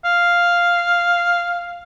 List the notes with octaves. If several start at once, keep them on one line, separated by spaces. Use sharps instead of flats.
F5